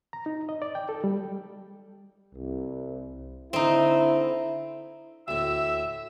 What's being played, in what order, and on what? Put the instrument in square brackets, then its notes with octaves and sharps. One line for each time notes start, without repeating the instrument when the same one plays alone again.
[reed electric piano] A#5
D#4
D#5
D5
G5
A4
G3
[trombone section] C2
[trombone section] D3 E4 [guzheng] C4 D#4
[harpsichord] D2 A2 [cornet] E5 [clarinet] E6